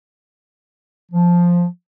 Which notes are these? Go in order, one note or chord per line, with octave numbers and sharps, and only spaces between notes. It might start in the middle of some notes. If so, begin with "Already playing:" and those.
F3